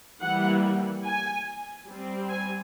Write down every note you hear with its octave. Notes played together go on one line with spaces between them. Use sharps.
E3 G3 A#3 F#5
G#5
G3 C4
G#5